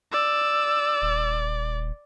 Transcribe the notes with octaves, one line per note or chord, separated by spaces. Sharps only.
D5 E6
D#1